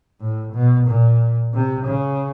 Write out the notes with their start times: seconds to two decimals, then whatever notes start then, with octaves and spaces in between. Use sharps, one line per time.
0.21 A2
0.53 B2
0.87 A#2
1.54 C3
1.86 C#3